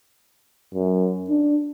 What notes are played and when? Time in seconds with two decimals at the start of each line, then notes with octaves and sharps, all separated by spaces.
0.74 F#2
1.29 D4